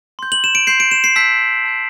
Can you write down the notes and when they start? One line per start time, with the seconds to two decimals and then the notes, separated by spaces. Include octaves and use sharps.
0.19 C6 G6
0.32 F#7
0.44 E7
0.55 D7
0.67 C6 G6 C7
0.80 D7
0.91 E7
1.04 C7
1.16 A5 E6 G6 B6
1.65 A5 E6 G6